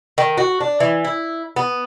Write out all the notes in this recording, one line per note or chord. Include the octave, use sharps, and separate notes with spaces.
D#3
F#4
D4
E3
E4
B3